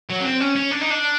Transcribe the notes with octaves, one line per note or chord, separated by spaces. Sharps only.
F#3
C#4
C4
C#4
C#4
D4
D#4
D4